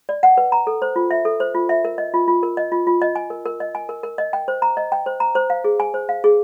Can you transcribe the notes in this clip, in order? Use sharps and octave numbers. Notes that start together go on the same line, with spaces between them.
D5
F#5
B4
A#5
A4
C5
F4
E5
A4
C5
F4
E5
A#4
D#5
F4
F4
A#4
D#5
F4
F4
D#5
G#5
A#4
A#4
D#5
G#5
A#4
A#4
D#5
G5
C5
A#5
D#5
G5
C5
A#5
C5
F5
G#4
G#5
C5
F5
G#4